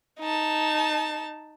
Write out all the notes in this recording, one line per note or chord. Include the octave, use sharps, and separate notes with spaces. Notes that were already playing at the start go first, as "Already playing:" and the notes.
D#4 A5